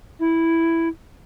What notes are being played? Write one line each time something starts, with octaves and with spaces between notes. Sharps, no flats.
E4